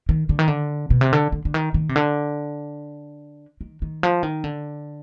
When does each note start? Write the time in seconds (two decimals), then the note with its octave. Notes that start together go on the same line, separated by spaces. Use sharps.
0.09 D#3
0.29 D3
0.39 D#3
0.48 D3
0.90 B2
1.01 C3
1.13 D3
1.32 D3
1.45 D3
1.54 D#3
1.74 D#3
1.89 C3
1.96 D3
3.61 D#3
3.82 D#3
4.03 F3
4.23 D#3
4.44 D3